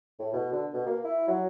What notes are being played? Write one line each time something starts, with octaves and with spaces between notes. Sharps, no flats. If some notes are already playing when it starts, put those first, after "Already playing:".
A2
B2
D3
B2
A#3
E4
F#3